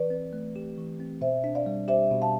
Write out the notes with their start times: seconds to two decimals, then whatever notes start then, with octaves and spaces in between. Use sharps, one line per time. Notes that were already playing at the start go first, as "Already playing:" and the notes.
Already playing: E3 B4 D5
0.10 C4
0.33 A3
0.56 G4
0.78 E3
1.00 C4
1.21 B2 C5 E5
1.44 D4
1.55 D5 F5
1.66 G3
1.88 G4 C5 E5
2.11 B2
2.22 F5 A5